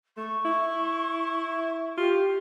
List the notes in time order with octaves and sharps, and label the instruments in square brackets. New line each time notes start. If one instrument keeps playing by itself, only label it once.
[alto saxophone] A3 [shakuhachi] C#6
[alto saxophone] E4
[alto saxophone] F4 [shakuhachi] G4